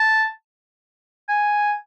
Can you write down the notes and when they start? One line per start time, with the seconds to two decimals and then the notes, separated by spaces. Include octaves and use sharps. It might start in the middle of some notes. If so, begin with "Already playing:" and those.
Already playing: A5
1.29 G#5